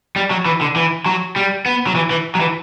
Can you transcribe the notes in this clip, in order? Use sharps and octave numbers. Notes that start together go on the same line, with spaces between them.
G3
F#3
E3
D3
E3
F#3
G3
B3
F#3
E3
E3
F#3
E3